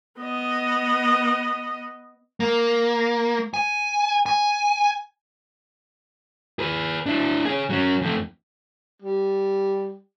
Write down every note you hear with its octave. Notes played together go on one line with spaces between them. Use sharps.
B3 D#5
A#3
G#5
G#5
G#4 B4
D4 E4
G#4 C#5
F#3 C#4
F2 A3
G3